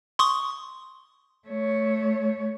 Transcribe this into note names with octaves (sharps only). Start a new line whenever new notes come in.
C6 C#6 D#6
A3 C#5